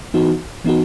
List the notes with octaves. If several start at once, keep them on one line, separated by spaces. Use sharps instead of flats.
E3 B3 D#4 F#4
E3 B3 D#4 F#4